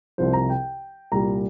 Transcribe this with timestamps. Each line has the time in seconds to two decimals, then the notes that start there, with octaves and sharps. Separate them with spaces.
0.18 C2 C3 F3 C5
0.33 A#5
0.50 G5
1.12 C2 A#2 G3 A#5